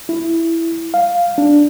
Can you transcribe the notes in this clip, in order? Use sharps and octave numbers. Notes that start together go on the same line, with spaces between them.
E4
F5
D4